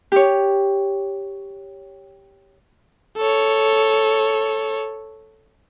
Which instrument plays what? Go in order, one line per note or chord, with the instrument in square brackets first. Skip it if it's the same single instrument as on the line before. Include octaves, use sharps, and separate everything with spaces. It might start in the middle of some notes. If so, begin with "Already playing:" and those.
[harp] G4 C#5
[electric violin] A4 C#5